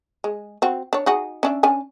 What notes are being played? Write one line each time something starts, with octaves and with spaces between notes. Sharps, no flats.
G#3
C4 F#4
D4 C#5
D#4 F#4 G#4
C#4 D4 E5
C#4 D4 G#5